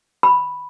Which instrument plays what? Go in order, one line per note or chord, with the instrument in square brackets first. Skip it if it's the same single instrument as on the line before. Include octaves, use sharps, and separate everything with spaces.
[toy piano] B5